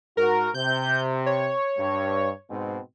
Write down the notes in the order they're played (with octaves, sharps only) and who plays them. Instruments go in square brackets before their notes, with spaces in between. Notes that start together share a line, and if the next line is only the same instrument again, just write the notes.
[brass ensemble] G#2 F#4 [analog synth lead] A#4
[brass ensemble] C3 [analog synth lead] G6
[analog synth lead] C#5
[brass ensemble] G2
G#2 B2 C4